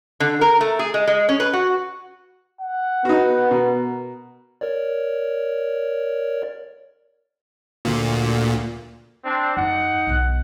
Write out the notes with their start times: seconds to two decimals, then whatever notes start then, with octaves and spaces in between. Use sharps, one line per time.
0.20 D3
0.41 A#4
0.61 A3
0.79 G#4
0.94 G#3
1.07 G#3
1.29 C#4
1.40 B4
1.53 F#4
2.61 F#5
3.05 B3 D#4 F#4
3.51 B2 A#4
4.61 A#4 C#5 D5
7.85 D2 A#2
9.25 C4 D4
9.57 F#2 D#4 F#5
10.07 B1 E3